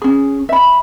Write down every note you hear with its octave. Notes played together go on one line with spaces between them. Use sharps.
C#4 G#4
E5 B5